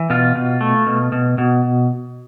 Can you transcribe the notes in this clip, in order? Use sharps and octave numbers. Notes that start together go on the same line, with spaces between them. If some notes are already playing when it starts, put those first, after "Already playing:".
Already playing: E3
B2 F4
B2
A3
B2
B2
B2